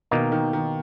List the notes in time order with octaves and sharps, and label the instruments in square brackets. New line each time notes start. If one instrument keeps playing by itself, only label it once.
[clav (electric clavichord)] B2 A#3 D#4 [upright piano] D#3
[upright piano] D#3
D#3